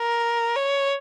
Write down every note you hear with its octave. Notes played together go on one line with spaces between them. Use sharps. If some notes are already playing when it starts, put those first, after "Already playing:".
Already playing: A#4
C#5